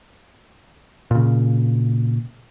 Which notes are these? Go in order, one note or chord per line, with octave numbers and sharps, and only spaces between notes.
A#2 C#3